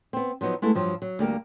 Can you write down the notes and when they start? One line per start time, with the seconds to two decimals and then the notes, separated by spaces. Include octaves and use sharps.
0.13 B3 C4
0.41 F3 F#3 B3 D#4
0.62 G#3 A3 B3 E4 A4
0.75 G2 F3 F#3
1.02 F#3
1.19 D2 G3 A#3 A#4